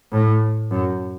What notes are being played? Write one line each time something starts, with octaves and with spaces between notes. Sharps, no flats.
A2
F#2